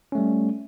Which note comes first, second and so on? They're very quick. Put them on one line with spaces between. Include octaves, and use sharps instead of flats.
C#4 A3 G3